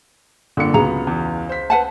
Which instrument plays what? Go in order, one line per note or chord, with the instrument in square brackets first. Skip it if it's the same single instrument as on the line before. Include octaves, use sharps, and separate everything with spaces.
[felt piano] G1 [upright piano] D3 A#3 C#7
[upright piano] C#2 [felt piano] F#3 B3 [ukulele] G#4 A#5
[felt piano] E2
C5 B6
[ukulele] B4 F#5 A5